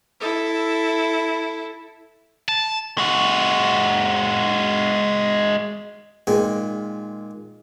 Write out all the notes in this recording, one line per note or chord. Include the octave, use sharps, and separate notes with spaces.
E4 A4
A5
G#3 F#4
A#2 D#3 G#3